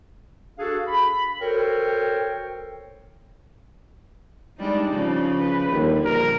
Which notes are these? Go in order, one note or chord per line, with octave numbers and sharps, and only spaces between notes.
D4 F#4 G#4 A4 F5
B5
F#4 A4 A#4 C5 C#5 G5
G3 G#3 D4 D#4
C#3 F3
B4
D#2 D3 G3
A#1 A#4